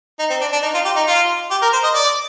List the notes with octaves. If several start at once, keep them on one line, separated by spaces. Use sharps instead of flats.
D#4
C4
D4
D4
D#4
F4
G4
D#4
F4
G4
A#4
C5
D#5
D5